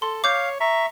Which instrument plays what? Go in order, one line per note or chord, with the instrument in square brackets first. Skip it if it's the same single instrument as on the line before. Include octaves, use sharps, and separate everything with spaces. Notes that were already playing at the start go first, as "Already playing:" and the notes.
[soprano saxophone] A4 [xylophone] C6
[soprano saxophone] C#5 [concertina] F5 [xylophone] D6 G6
[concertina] E5 C#6 [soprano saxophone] A#5